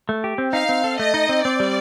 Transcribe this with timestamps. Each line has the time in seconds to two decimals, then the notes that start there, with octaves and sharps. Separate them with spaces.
0.09 A3
0.24 G4
0.38 C4
0.53 D#4 F5
0.69 C4
0.84 A4
0.99 A3 D#5
1.14 D#4
1.29 C4
1.45 C4 D5
1.60 G3